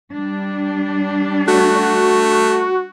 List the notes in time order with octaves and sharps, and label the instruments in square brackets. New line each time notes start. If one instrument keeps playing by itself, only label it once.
[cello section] G3 D4
[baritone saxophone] A3 [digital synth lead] F#4